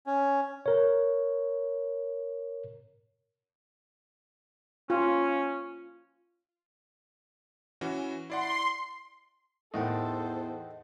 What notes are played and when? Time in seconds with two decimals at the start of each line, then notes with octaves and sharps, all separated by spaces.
0.07 C#4
0.66 A#4 C#5
4.90 C#4 F4
7.81 E3 C#4 F#4
8.30 E4 D5 F#5 C6
9.74 E2 A2 D#3 A4 C5 D#5 F#5 G5